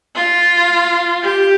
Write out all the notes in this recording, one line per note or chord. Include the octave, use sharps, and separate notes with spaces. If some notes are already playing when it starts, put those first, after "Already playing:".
F4
G4